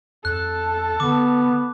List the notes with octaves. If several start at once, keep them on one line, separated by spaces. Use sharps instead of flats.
F2 A4 A5 F#6
D3 B3 D6